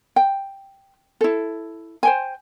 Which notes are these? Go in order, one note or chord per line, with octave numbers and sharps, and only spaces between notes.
G5
E4 A4
C5 G5 G#5